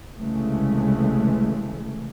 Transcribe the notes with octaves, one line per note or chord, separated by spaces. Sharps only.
C2 C#3 E3 G#3 A3